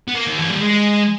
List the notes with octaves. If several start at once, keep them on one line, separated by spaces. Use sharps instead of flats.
B3
A#3
D#3
E3
G3
G#3